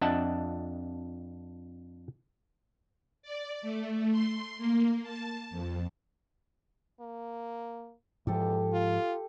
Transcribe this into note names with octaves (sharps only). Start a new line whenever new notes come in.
F2 D4 D#5 E5 F#5 A5
D5
A3
C6
A#3
A5
F2
A#3
E2 G#2 F3 G4 A4 G5
F4